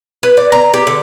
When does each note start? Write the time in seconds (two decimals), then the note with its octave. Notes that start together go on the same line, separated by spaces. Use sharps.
0.23 B4
0.37 D5
0.52 A#5
0.74 G4
0.87 D3